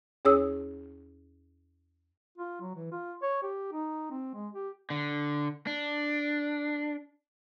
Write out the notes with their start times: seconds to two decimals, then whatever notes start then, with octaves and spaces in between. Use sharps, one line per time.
0.25 E2 C#4 G#4 C#5 D#6 E6
2.37 F4
2.61 F#3
2.75 E3
2.92 F4
3.22 C#5
3.42 G4
3.72 D#4
4.11 C4
4.34 G#3
4.53 G4
4.90 D3
5.67 D4